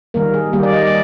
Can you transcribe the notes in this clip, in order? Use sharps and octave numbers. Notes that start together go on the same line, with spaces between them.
D#3 G3 A#3 A#4
G#4
D#3 G3 A#3 G4
D5
D#5
D5